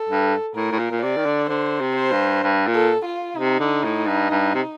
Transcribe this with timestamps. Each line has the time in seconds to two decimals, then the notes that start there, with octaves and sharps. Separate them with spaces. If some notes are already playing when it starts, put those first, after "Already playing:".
Already playing: A4
0.09 G2
0.56 A2 A#4
0.72 A2
0.79 A#2
0.91 A#2
1.02 C3 D5
1.17 D#3
1.26 D3
1.50 D3 C5
1.80 C3
1.96 C5
2.12 G2
2.43 G2
2.67 A#2
2.74 A4
3.05 F4
3.36 C3 D#4
3.60 D3
3.84 A2
4.07 G2
4.31 G2
4.54 C3